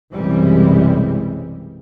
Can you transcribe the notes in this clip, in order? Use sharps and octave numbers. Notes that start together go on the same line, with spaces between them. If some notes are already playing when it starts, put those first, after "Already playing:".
B1 F#2 C3 E3 G3 G#3